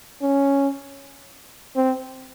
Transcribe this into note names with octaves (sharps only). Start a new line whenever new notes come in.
C#4
C4